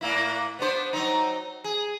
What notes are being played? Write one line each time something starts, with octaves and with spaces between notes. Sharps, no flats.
A2 A#3 E4
B3 D4 C5
F#3 C4 D#4
G#4